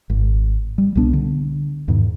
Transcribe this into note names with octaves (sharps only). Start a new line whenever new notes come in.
G#1
G3
C2 B2 B3 D4
D3
E2 G#2 B2 D#3